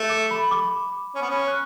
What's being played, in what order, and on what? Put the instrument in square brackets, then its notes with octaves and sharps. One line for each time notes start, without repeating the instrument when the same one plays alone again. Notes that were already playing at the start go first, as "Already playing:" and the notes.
Already playing: [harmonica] A3 [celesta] E6
[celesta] D6
B5
D6
[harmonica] C#4
B3
C#4
[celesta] F#6